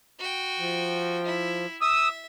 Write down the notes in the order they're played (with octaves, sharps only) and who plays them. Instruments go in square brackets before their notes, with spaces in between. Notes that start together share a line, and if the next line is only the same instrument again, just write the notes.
[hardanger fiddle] F#4 G5
[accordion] F3
[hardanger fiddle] E4
[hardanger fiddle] E5 [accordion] D#6 E6